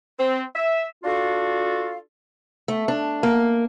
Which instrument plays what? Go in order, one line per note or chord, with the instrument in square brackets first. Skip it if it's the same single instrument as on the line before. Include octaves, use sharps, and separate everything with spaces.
[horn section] C4
E5
[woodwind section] D4 F4 F#4 A4 F5
[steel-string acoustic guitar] A3
D4
A#3